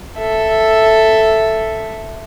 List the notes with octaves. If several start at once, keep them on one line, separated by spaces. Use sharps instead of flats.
A4 E5